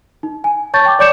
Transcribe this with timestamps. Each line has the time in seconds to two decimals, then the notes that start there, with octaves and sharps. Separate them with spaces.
0.23 D#4
0.44 G#5
0.74 C#5 A5 C#6 G6 A6
0.86 G5 D6
0.99 C#5 D5 D6 G6 C#7 E7